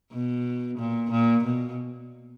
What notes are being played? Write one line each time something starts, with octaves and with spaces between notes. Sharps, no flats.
B2
A#2
A#2
B2